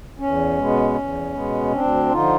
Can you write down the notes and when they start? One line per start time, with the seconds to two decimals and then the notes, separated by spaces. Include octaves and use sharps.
0.19 E2 C#4
0.58 B2 G#3 B3
0.95 E2
1.34 B2 G#3 B3
1.72 D2 C4 D4
2.10 D3 F3 D#4 F4